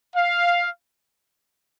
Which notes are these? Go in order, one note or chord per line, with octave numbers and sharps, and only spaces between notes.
F5